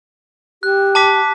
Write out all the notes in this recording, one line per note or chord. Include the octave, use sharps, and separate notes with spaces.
G4 F#6
A5 D6 B6